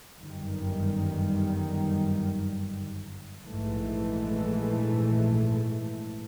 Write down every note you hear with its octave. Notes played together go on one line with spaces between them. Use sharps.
G1 F#2 D#3 G3
A#1 G#2 E3 A3